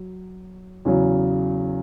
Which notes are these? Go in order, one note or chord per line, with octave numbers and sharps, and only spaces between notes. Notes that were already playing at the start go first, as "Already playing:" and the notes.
Already playing: F#3
E2 C#3 F#3